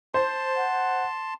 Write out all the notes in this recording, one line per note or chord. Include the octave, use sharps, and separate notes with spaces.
C5 A5 C6
F#5